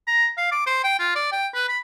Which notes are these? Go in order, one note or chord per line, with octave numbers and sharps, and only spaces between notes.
A#5
F5
D6
C5
G5
F4
D5
G5
B4
B5